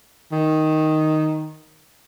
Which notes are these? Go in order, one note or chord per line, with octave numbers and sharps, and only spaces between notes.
D#3